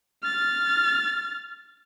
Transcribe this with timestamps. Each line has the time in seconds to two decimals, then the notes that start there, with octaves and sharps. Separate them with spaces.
0.23 F6 A6